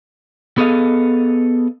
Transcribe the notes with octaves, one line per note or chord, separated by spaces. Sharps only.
B3 G#4 A4 D#5 F5